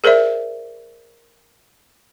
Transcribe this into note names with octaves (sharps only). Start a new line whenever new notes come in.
G#4 A#4 C5 D5 E5